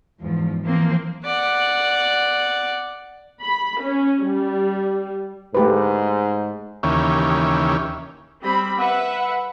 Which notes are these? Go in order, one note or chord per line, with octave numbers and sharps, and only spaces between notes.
E2 G#2 F3
E3 F3 A#3 C4
D5 F#5
B5
C#4
G3
G#2 A3 G4 B4
D#2 C#3 E3 A#3 C#4 G4
G3 C4 B5
B4 E5 F#5